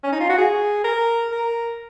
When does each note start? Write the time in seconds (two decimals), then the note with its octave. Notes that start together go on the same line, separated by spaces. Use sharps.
0.04 C#4
0.12 D#4
0.20 F4
0.30 F#4
0.38 G#4
0.84 A#4
1.32 A#4